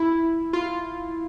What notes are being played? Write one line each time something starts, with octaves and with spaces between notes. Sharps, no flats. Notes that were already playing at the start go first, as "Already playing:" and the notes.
Already playing: E4
F4